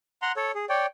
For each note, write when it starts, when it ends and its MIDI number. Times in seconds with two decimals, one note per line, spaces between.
0.22 0.32 78
0.22 0.32 82
0.22 0.32 84
0.36 0.52 69
0.36 0.52 73
0.55 0.65 68
0.69 0.86 73
0.69 0.86 74
0.69 0.86 79